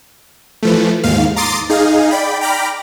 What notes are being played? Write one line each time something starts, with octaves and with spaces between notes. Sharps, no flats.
E3 F3 A3
D#2 G#2 F5
A#5 C6 D6 D#6 A6 C7
D#4 G#4 F5
D5 G5 B5
G5 A#5 B5 D6 F6